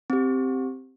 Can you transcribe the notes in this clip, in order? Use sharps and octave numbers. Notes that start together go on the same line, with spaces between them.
C4 G4